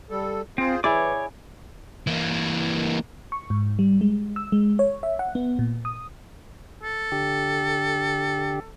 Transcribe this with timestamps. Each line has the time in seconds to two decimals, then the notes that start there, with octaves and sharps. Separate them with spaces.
0.10 G3 A4
0.58 C4 F4 G#4 C5
0.84 E3 E4 G#4 C#5 D5 D6
2.07 E3 A#3
3.32 C#6
3.50 G#2
3.79 G3
4.01 G#3
4.36 E6
4.52 G#3
4.79 C#5
5.03 E5
5.19 F#5
5.35 B3
5.59 A#2
5.85 D#6
6.83 A4
7.12 D3 G4